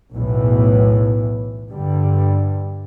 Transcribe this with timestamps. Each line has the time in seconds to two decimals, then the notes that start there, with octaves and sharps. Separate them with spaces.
0.13 B1 E2 A2 E3
1.71 G2 D3 G3